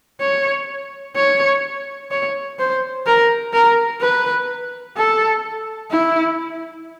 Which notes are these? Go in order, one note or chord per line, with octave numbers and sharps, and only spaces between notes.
C#5
C#5
C#5
C5
A#4
A#4
B4
A4
E4